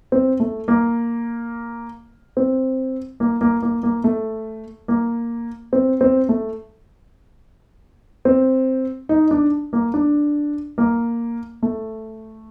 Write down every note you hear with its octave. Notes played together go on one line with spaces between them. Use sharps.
C4
A3
A#3
C4
A#3
A#3
A#3
A#3
A3
A#3
C4
C4
A3
C4
D#4
D4
A#3
D4
A#3
A3